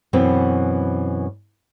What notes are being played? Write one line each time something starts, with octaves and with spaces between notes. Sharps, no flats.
F#2 B2 E3 B3 C4